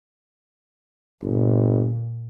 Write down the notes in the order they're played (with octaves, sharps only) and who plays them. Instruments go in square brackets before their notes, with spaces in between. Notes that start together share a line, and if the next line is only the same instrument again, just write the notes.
[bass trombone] G1 [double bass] A#2